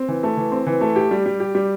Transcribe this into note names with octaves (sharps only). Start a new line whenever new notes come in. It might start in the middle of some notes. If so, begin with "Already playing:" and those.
Already playing: C4
E3
A3
E3
C4
E3
A3
G4
G3
G3
G4
G3